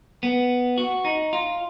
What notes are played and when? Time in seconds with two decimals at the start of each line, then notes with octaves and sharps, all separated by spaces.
0.23 B3
0.78 F#4
1.05 D#4
1.33 F4